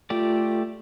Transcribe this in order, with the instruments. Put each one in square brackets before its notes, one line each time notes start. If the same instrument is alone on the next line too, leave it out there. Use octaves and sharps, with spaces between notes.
[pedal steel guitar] A3 G4 D5 [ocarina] F4